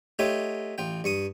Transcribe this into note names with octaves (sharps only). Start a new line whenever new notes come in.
A3 D#4 F4 G4 A4 C#5
A1 F4 G5
G2 C#6 D#6